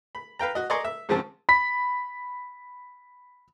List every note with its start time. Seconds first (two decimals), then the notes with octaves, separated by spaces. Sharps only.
0.15 B5
0.39 B4 F5 G5 A#5
0.55 F#4 D#5
0.70 D5 D#5 G#5 A#5 C6 C#6
0.84 E5
1.09 G#2 C#3 F3 C4 A5
1.49 B5 B6